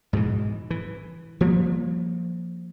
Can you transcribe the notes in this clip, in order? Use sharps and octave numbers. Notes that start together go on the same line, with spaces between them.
G#2 B2 D#3 E3
E3
F3 G3 A#3